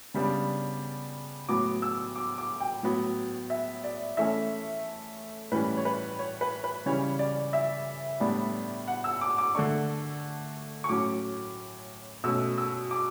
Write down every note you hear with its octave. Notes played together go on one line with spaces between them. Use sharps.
C#3 G3 B3 D4
A2 F#3 B3 D6
E6
D6
D6
G5
A2 F#3 B3
E5
D5
E3 A3 C#4 E5
A2 E3 G3 C#4 B4
C#5
B4
C#5
B4
B4
C#3 E3 G3 C#4 C#5
D5
E5
A2 G3 B3 D4
F#5
E6
D6
D6
D3 A3 D4 C#6
C#6
A2 F#3 C#4 D6
B2 A3 C#4 E6
E6
D6